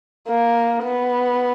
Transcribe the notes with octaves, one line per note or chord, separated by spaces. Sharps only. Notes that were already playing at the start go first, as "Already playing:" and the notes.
A#3
B3